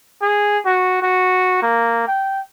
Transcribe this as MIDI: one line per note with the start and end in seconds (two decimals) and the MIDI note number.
0.22 0.58 68
0.66 0.99 66
1.02 1.58 66
1.62 2.03 58
2.08 2.40 79